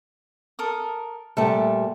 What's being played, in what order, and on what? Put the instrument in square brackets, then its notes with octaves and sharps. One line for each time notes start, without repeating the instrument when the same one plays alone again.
[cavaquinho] A4 A#4 D#6
[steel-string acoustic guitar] A#2 G3 A3 [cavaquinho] A4 F#5 A5